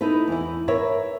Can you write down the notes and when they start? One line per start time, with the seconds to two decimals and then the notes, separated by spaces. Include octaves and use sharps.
0.01 D#4 E4 A4 B4
0.28 E2 E4
0.68 A#4 B4 C#5 E5